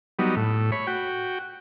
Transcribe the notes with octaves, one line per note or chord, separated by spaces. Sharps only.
F#3 G3 B3 D#4
A2
C#5 B5
F#4 G5